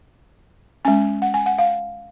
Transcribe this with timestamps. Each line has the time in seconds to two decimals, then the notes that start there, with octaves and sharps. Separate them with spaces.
0.85 G#3 C#4 G#5
1.22 F#5
1.34 G#5
1.46 F#5
1.58 F5